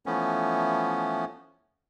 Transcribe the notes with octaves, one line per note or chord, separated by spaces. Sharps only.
E3 F3 A3 B3 C#4